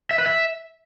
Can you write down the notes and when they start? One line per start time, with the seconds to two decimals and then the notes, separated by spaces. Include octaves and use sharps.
0.11 E5
0.18 B4
0.26 E5